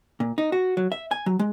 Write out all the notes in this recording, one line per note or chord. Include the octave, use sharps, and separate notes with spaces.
A#2
D#4
F#4
F#3
E5
G#5
F#3
G#3